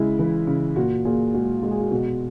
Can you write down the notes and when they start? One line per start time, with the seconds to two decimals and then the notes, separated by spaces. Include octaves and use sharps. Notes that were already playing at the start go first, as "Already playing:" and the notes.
Already playing: C#3 G#3 E4
0.19 E3
0.47 C#3
0.76 A#2 F#4
1.05 A#2 G#4
1.34 G#3 F#4
1.62 G#3 F#4
1.71 G#4
1.81 F#4
1.91 B2 F#4